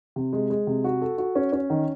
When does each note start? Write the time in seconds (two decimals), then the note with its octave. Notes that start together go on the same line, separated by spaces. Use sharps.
0.16 C3
0.33 G#3
0.50 G#3
0.67 C3
0.84 F#4
1.02 A4
1.18 F#4
1.36 C#4
1.53 C#4
1.70 D#3